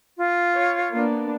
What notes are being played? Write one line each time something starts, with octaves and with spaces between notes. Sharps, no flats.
F4
C#5
A#3 B3 D4